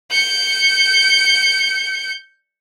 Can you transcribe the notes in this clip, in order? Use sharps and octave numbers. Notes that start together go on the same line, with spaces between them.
G6 C#7